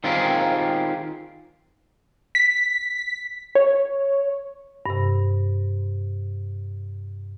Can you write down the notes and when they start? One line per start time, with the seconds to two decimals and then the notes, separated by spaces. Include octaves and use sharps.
0.04 D#3 C4 F4 G4 G#4 A#4
2.35 B6
3.55 C#5
4.86 G2 C3